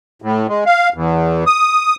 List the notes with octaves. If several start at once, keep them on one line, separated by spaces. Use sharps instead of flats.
A2
G#3
F5
E2
D#6